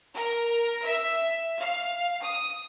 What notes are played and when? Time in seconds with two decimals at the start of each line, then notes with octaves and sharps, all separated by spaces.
0.14 A#4
0.85 E5
1.59 F5
2.23 D#6